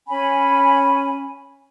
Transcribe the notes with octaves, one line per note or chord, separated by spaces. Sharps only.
C#4 G#5 B5